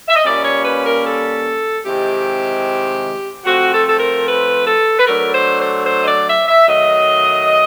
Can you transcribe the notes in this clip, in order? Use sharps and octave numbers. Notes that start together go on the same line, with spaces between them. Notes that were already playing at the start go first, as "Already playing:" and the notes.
E5
D#5
A#2 G3 A#3 C#4 D5
C#5
B4
A#4
A4
C3 D#3 G#3 C4 E4 G4
F3 A3 C4 F#4
A4
A4
A#4
B4
A4
B4
F#3 A3 D4 A#4
C5
C5
C5
D#5
D5
E5
E5
D#3 F#3 A3 D#5